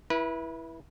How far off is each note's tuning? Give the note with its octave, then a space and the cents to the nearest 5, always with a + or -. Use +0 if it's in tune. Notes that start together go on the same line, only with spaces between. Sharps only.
E4 +0 B4 -30